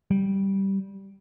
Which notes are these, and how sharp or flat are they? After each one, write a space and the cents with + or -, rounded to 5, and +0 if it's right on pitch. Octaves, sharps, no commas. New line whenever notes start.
G3 -10